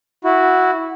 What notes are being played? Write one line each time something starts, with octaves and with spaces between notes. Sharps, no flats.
E4 F#4